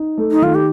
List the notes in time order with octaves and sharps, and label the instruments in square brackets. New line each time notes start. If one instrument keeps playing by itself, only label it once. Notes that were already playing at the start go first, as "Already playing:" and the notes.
Already playing: [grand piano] D#4
A3
[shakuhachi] D#4
[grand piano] D#3 [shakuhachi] F4
[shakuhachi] G4